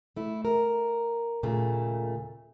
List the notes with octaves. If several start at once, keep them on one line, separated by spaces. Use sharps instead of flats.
A3 E4
A#4
D#2 A#2 C#3 A3